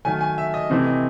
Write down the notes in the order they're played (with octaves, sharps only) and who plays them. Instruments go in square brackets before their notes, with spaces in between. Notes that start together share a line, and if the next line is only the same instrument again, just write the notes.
[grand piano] D#3 F#3 A3 G#5
G#5
E5
D#5
C3 E3 A3 C4 C5
D#5